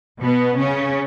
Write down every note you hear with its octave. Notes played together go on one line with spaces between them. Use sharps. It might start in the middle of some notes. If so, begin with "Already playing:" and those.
B2 B3
C#3 C#4